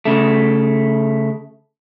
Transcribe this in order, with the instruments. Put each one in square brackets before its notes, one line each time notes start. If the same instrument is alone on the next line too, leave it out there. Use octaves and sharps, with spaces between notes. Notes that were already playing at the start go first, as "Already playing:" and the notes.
[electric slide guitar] C#3 A3